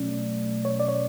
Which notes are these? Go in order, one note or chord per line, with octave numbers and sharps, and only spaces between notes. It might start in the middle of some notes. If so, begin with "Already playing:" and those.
Already playing: B2 F#3 A3 C#4 D5
C#5
D5
C#5